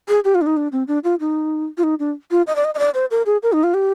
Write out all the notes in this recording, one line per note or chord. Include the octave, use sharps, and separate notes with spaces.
G#4
G4
F4
D4
D#4
D4
C4
D4
F4
D#4
F4
D#4
D4
F4
D#5
D5
D#5
D#5
D5
C5
A#4
G#4
A#4
D#4
F4
G4